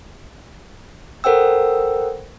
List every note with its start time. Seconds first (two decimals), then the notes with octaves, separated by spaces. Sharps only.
1.24 A4 A#4 C5 F#5 G5 E6